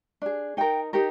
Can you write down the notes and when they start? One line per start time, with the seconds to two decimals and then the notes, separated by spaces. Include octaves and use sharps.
0.22 D4 G#4
0.57 D#4 A#4 G5
0.93 D#4 G4 A#4